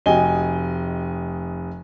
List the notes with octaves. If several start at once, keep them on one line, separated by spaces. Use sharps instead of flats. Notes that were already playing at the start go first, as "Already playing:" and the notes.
F1 F#4 D#5 G5 G#5 G7